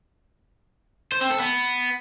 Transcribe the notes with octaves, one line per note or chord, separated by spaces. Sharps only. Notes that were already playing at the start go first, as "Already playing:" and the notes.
C5
C4
A4
B3